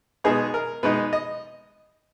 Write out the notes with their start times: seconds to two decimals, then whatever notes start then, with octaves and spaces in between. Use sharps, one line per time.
0.24 B2 G#3 B3 D#4 G#4
0.54 A#4
0.83 B2 G#3 B3 D#4 B4
1.13 D#5